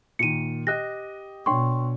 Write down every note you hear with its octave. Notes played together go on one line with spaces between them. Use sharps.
A#2 D#3 C#7 D#7
G4 D#5 F#6 A#6
B2 D4 C#5 G5 C6 C#6